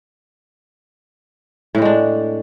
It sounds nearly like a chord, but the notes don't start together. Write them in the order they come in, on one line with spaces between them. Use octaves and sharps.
A2 C4 G#3 D4